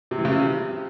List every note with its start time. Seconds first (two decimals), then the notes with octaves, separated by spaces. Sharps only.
0.11 C3
0.18 E3
0.25 C#3
0.32 C3